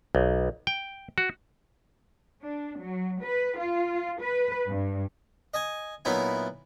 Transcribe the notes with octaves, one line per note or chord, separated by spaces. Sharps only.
B1
G5
F#4
D4
F#3
B4
F4
B4
G2
D#5 G#5
A#2 F#3 B3 D#4 E4